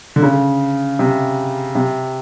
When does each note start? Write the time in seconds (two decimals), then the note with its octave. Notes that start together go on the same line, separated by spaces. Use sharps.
0.16 D3
0.23 C#3
0.99 C3
1.75 C3